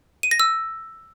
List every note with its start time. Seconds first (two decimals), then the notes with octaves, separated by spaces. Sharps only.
0.23 D#7
0.31 A#6
0.40 E6